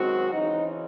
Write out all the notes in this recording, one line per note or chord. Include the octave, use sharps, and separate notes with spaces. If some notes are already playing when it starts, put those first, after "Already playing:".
Already playing: F#2 D#3 G#3 C4 F#4
C#3 E3 C4 D#4